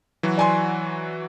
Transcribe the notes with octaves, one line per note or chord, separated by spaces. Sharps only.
E3 F#3 F#4
D5 G#5 C6